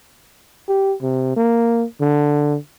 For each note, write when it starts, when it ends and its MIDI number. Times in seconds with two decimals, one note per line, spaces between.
0.69 0.94 67
1.02 1.34 48
1.36 1.84 58
2.01 2.57 50